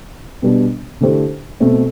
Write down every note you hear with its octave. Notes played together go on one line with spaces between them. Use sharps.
B2 G3 B3 D4
D3 A3 E4 G4 C5
B2 A3 C4